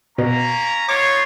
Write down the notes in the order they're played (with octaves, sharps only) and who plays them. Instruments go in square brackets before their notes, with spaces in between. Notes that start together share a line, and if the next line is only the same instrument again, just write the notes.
[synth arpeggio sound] B2 [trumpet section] A#3 C#4 A#5
[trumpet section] B3 D#4 F4 [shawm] C#5 [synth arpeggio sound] D6